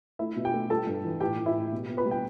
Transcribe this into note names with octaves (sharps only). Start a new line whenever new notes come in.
A3 E4 E5
B2
G4 G5
A3
G3 A4 A5
G2
E3
A2 G4 G5
A2
E4 E5
A2
B2
B3
B4 B5
G3
G5